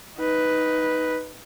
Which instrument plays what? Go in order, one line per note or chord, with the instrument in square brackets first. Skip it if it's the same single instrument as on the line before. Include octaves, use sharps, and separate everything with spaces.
[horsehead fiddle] D#4 B4